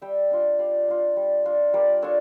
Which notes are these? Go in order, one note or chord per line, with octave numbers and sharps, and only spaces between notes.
G3 E5 G5
D4 F4
G3 D5 F5
D4 F4
G3
D4 F4
G3 A#4 D5
D4 F4 A4 C#5